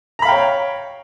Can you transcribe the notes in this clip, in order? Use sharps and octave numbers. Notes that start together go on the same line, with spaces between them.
C#5 F5 G5 A#5 B5